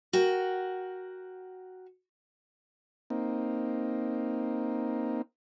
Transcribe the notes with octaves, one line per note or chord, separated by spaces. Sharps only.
F#4 A#4 G5
A#3 C4 D#4